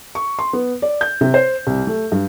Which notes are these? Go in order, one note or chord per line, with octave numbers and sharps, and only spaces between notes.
C#6
C6
B3
D5
G6
C3
C5
C2
A3
G2